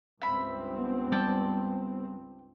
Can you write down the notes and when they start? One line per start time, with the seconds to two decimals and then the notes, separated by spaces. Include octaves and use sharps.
0.22 C#2 G2 C4 E5 B5
0.79 B3
1.12 G3 D5 G5 A5